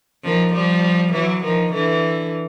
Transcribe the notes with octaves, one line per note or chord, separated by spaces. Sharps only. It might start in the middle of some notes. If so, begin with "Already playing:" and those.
D#3 F3
F3 G3
E3 F#3
D#3 F3
D3 E3